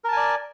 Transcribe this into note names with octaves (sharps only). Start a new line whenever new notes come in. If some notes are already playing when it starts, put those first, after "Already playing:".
A#4 D5 G#5 A5